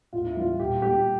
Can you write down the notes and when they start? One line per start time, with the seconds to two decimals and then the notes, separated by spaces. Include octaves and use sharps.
0.13 A2 F4
0.26 E4
0.36 E3 G3 F4
0.60 A#2 G4
0.82 G3 G4